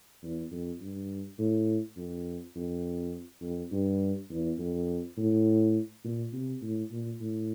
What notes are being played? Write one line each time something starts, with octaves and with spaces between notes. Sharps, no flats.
E2
F2
G2
A2
F2
F2
F2
G2
E2
F2
A2
A#2
C3
A2
A#2
A2